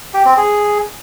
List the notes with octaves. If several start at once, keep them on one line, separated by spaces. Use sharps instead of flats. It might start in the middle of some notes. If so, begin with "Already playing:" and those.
G4
C4
G#4